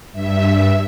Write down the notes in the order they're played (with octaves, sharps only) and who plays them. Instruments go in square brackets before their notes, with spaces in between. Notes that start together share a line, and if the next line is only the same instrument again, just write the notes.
[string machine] G2 E5